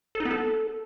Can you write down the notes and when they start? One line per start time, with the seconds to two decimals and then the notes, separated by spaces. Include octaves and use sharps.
0.15 A4
0.20 D#4
0.25 B3
0.31 A4